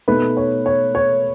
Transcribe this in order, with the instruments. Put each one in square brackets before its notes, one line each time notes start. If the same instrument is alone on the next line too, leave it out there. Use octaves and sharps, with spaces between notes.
[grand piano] B2 A3 D#4 B4
C#5
C#5
C#5